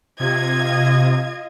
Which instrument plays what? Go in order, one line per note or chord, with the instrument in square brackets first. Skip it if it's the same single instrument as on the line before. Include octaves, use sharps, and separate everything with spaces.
[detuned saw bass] C3 [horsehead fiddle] F4 D#5 [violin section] G#6